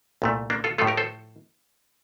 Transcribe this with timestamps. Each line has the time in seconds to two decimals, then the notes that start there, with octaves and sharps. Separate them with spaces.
0.22 C2 A#2 A3
0.50 A#3 D4
0.64 F4 A4
0.78 A2 F3 A3 F4 A4
0.87 G4 A#4
0.97 A4 C5